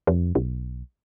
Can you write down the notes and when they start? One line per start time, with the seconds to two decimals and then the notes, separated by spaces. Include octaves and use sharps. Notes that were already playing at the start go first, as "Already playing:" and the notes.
0.07 F2
0.35 B1